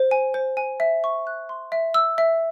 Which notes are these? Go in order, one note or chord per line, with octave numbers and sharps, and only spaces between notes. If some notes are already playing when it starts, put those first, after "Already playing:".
Already playing: C5
G#5
C5
G#5
E5
C#6
F#6
C6
E5
E6
E5